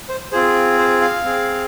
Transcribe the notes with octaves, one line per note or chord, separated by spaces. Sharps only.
C5
C4 F4 G#4 C5
C5
F5
C4 G#4